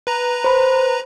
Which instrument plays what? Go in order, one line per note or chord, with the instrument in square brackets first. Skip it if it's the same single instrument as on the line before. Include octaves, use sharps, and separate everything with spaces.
[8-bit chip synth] B4 A#5
[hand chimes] C5 B5